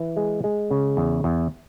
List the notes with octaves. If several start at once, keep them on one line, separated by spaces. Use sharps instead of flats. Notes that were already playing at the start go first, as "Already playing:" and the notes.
Already playing: E3
G#3
G#3
C#3
E2
E2